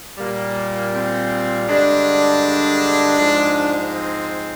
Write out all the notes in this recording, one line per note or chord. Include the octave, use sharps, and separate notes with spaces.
A#2 G3 A#3
C4
G2 D3 G#3 D4
G#2 F3 G#3
C4